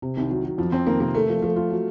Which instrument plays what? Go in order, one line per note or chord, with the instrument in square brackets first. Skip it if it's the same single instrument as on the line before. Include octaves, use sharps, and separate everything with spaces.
[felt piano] C3
[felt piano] C2 [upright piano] D#3
[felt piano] F#3
F#3
[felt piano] F2 [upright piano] F3
[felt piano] F2 [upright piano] C4
[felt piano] D#3 [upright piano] A#3
[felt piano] C3 [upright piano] A#3
[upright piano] A3 [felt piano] A#4
[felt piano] F3
[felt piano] F3 [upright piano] A3
[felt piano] F4
F#3